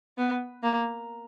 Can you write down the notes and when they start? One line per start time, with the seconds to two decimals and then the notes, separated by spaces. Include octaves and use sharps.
0.18 B3
0.63 A#3